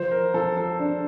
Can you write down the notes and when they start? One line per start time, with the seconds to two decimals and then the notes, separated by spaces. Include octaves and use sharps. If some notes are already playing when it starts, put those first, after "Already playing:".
Already playing: F3 C5
0.11 A#4
0.34 F3 A4
0.57 A4
0.79 D4